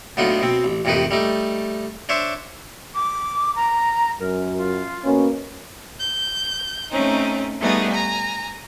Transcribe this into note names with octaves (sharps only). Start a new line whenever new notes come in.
A2 D3 F#3 B3 D#4 F4
B2 C4
A1
A1 F2 C3 D#3 D#4 B4
G3 A3 D#4
D4 C5 C#5 E5
D6
A#5
F#2 A#4
F4
B2 A#3 C#4
G6
A3 C4 C#4 D#4
G3 A3 B3 D#4 G#4
G#5 A#5